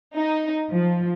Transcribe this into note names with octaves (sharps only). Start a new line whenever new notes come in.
D#4
F3